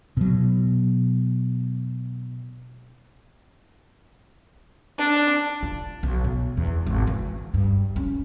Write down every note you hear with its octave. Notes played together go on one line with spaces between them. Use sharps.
B2 F#3
D4
F4
B1
B2
E2
G#1
E3
G2
C#4